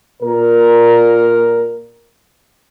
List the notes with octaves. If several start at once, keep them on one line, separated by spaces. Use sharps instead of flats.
A#2 A#4